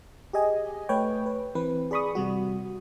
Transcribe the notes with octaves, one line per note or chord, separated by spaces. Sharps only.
G4 G#4 D#5 G#5
A3 B4 C#5 G5
B4
E3 C4 B4
G#4 D5 B5 C#6 D#6
C3 G3 F#4